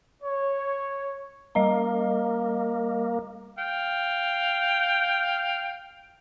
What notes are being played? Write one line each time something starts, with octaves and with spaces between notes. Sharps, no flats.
C#5
G3 A#3 D#5 A#5
F5 G5